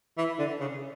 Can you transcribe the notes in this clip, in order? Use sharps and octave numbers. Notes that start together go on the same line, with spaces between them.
E3
D3
C#3